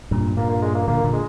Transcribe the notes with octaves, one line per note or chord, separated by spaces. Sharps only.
G2 A#2
G2 A#2 A#3
A#3
G#3
A#3
A#2 D3 A#3
A#2 D3
G#3